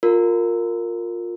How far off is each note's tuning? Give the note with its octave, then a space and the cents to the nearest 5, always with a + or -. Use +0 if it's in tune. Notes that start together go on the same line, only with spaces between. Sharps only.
F4 +15 A#4 -15